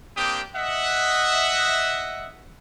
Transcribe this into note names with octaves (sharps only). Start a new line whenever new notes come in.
A#3 C4 D4 G4 G5 D#6
D#5 E5 F#5